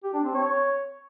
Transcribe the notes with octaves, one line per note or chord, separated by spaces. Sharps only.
G4
D4
C4
C#5